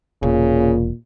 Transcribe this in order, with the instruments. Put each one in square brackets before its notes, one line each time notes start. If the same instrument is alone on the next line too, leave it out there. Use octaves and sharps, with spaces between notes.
[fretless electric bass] E1 [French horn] A#2 [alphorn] C#3